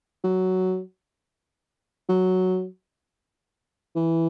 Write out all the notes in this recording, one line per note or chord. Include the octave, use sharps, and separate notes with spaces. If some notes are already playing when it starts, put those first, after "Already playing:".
F#3
F#3
E3